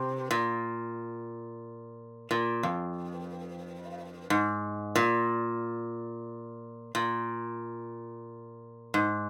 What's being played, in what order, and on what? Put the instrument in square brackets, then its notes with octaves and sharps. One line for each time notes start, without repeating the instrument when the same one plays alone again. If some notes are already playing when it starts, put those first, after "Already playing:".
Already playing: [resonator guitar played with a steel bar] C3
A#2
A#2
F2
G#2
A#2
A#2
G#2